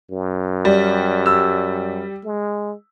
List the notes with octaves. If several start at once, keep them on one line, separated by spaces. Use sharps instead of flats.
F#2
G3
E6
G#3